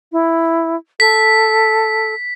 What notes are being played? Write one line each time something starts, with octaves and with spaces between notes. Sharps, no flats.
E4
A4 B6